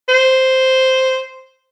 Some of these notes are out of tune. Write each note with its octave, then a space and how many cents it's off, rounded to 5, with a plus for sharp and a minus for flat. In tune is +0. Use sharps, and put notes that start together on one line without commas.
C5 -5